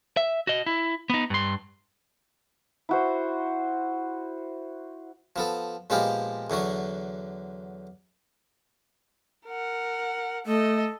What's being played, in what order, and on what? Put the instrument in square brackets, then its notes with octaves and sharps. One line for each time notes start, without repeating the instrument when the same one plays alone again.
[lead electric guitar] E5
F#4 D#5
E4
B3 D#4
G2 C6
[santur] E4 F#4 C5
[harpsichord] F3 B3 A4
A#2 F3 G#3 B3 F4 G4
E2 D3 F#3 F#4
[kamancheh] A#4 F#5
[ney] A3 [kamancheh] A4 D#5